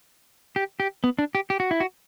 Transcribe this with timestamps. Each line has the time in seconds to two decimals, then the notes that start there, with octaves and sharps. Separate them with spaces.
0.56 G4
0.80 G4
1.04 B3
1.19 D4
1.35 G4
1.50 G4
1.60 F#4
1.71 E4
1.80 F#4